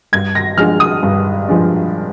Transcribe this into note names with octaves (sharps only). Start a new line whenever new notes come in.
G2 G#6
A#6
F3 G#3 D4 F6
D#6
G2
F3 G#3 D4